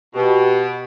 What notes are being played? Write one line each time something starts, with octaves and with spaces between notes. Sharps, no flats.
B2 G4